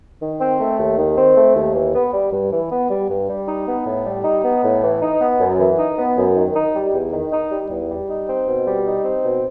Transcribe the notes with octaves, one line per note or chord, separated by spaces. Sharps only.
D#3
C4
A3
D#2
D#3
C4
A3
D#2
E3
B3
G3
G2
E3
B3
G3
G2
G3
D#4
B3
A2
G3
D#4
B3
A2
E3
D#4
B3
F#2
E3
D#4
B3
F#2
D#3
D#4
G3
E2
D#3
D#4
G3
E2
G3
D#4
C4
B2
G3
D#4
C4
B2